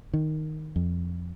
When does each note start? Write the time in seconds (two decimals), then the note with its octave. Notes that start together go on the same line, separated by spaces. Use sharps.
0.14 D#3
0.76 F2